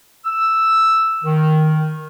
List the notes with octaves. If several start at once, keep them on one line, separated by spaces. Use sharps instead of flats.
E6
D#3